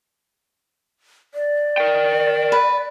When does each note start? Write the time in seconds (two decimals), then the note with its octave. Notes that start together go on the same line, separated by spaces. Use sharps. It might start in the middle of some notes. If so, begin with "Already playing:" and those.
1.34 D5
1.78 A#4 G5
2.52 B4